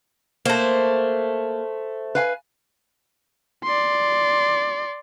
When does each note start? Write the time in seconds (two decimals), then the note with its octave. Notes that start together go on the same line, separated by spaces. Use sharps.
0.45 A3 A#3 C5
2.15 B4 F5 G#5
3.64 D5 C6